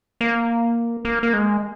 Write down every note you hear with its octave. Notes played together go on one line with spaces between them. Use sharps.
A#3
A#3
A#3
G#3